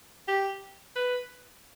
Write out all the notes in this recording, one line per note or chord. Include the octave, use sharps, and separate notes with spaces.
G4
B4